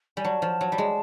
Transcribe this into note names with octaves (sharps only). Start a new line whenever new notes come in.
G3 G#5
F#3 A5
F3
F#3
G3
G#3